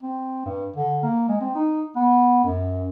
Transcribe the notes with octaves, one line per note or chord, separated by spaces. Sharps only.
C4
G2
D3
A#3
G#3
C4
D#4
B3
F#2